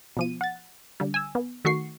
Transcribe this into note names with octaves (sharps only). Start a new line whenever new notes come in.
B2 F3 D#7
F#5 A6
D3 G3
G#5 E6
B3
D#3 A3 F#4 C#6 C7